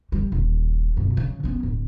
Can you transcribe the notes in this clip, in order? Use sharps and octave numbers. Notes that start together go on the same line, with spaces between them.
G3
D#1
B1 F#2
C#3
B3 C#4
D1